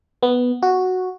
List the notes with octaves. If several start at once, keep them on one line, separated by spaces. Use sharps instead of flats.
B3
F#4